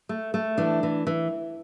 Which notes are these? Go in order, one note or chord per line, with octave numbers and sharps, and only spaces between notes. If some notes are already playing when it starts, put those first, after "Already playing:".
A3
A3
E3 D4
E3
E3